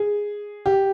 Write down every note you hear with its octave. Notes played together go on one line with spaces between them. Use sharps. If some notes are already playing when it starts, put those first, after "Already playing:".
Already playing: G#4
G4